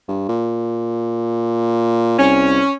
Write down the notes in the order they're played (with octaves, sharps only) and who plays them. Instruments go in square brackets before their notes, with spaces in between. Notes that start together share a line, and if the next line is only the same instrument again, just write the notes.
[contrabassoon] G2
A#2
[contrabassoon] C2 [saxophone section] C#4